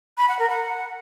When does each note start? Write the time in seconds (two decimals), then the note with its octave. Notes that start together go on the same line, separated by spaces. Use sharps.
0.17 B5
0.28 F#5
0.39 A#4
0.50 F#5